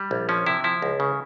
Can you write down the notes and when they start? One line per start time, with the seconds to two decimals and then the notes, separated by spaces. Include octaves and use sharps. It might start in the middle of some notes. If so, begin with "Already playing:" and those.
Already playing: G3
0.11 A#1
0.29 F3 C#4
0.46 C3 E4
0.64 F3 E4
0.82 C#2
1.00 C#3